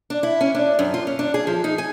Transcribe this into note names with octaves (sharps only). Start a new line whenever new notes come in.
D4
E4
C#4
D4
F#2
F4
C#4
D4
G#4
F3
D#4
G#5